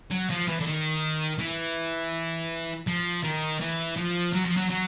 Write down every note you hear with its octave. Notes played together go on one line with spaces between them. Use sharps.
F#3
F3
E3
D3
D#3
E3
F3
D#3
E3
F3
F#3
F3
F#3
F#3